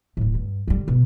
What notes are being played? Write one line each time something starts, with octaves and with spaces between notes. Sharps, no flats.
D1 A2
G2
D3 G3
B2